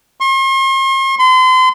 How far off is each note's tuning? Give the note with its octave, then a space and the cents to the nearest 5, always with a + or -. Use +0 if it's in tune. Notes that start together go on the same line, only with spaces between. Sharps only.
C6 +45
C6 -35